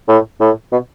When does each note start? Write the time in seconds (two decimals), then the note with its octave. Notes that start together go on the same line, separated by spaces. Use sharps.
0.08 A2
0.40 A2
0.72 B2